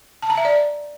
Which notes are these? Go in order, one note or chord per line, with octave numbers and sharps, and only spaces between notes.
A5
A#5
E5
D5